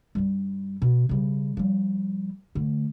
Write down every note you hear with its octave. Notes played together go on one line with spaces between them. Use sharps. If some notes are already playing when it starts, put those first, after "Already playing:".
G2 G3
B2
C#3 G3
F3 G3
D3 A3